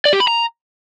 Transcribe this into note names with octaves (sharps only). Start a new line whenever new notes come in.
D5
G4
B5
A#5